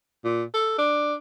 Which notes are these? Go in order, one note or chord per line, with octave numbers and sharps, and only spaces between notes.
A#2
A4
D4